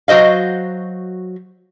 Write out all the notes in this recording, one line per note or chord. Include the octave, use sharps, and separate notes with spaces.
F#3 F#4 C5 D#5 F5